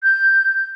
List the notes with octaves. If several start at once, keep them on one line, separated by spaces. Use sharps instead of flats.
G6